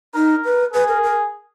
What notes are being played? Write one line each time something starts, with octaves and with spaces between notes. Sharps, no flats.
D#4 A#4
B4
G#4 B4
A#4
A#4